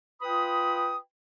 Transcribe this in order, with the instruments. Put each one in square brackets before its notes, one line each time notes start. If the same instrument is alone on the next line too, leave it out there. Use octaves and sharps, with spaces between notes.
[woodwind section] F4 B4 G5 B5 D#6